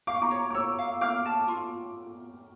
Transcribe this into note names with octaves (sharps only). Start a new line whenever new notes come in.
F5 D6
C#6
A#5 D6
C#5
D6
C#5 C#6 E6
F5
F5 D6 F6
A5
F4